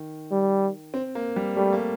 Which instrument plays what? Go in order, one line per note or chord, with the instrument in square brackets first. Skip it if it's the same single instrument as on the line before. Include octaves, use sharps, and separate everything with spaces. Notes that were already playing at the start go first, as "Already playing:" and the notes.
Already playing: [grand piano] D#3
[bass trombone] G3
[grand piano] C4
A#3
G3
[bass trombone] G3 [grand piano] A3
[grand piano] A#3